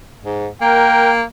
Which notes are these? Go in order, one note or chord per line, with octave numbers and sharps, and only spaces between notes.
G#2
A#3 A#4 G5